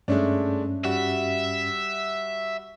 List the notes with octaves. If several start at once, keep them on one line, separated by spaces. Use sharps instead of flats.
G2 G#3 A3 C#4 D4
G3 F#4 E5